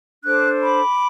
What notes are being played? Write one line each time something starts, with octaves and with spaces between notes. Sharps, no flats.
D4 A4 C5 D6 F#6
B5 D6